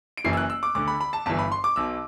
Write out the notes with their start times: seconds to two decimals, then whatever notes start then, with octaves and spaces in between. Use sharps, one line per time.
0.17 D7
0.25 F#1 F#2 E3 C7
0.33 E6
0.37 F#6
0.50 E6
0.63 D6
0.75 D2 D3 D6
0.87 B5
1.00 B5
1.13 A5
1.26 G1 G2 E3 A5
1.39 B5
1.52 C6
1.64 D6
1.76 B1 B2 E6